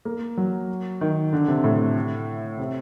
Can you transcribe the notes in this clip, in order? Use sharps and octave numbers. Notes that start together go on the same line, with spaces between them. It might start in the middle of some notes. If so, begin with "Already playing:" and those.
A#3
F#3
D#3
D3
C3
A2
C3